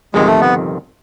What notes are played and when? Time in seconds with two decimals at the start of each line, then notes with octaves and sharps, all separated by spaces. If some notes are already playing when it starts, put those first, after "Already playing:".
0.14 G1 F2 C3 D#3 G#3
0.27 A3
0.41 B3